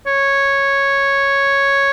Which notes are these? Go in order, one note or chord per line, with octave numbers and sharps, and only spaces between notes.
C#5